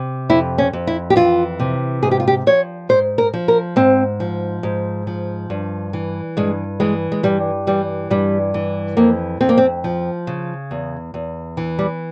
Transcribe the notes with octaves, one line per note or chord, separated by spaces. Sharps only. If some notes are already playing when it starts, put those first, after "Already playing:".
Already playing: C3
F2 E4
C#4
F2
E4
G4
E3 F4
C3
G#2 G#4
G4
F4
G4
F3 C#5
G#2 C5
A#4
F3
A#4
G#2 C4
F3
G#2
F3
G2
E3
G2 G#3
E3 G#3
G#3
G2 G3
E3 G3
G2 G3
E3
F2 A#3
F2 C4
A#3
C4
F3
C#3
E2
E2
E3
G3